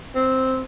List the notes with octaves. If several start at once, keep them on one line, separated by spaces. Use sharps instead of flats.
C4